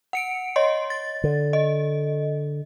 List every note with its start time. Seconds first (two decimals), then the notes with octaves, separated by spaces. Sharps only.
0.13 F#5 C#7 D7
0.56 C#5 D#5 C6
0.90 A6
1.24 D3
1.53 D#5